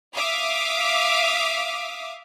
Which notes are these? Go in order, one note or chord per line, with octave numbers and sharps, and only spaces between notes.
E5 F5 D6 D#6